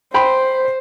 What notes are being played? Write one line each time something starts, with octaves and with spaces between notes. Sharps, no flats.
C5 G5 B5 C6